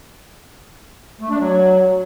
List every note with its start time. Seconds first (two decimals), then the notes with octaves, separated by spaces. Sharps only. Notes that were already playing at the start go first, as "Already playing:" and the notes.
1.21 A3
1.30 D4
1.39 F#3